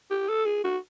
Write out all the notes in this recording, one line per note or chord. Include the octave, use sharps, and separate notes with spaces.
G4
A4
G#4
F#4